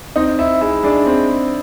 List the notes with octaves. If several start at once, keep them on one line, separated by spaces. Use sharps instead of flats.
C4 D#4
D#4 E4
G#3 E4
G#3 D4
C4